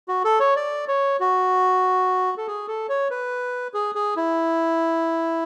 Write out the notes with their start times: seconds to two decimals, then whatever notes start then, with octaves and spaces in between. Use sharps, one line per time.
0.08 F#4
0.25 A4
0.40 C#5
0.56 D5
0.88 C#5
1.20 F#4
2.38 A4
2.47 G#4
2.68 A4
2.89 C#5
3.10 B4
3.74 G#4
3.95 G#4
4.16 E4